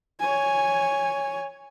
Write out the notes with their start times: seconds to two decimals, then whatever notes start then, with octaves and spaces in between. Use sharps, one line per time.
0.20 C#5 G#5